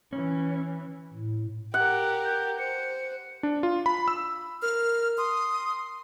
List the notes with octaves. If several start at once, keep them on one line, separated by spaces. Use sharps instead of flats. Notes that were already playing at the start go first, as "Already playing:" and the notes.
E3 C#4
A2
G4 A#4 F#5
G6
C5 C#7
D4
F4
B5
E6
A#4 F6
C6 D#6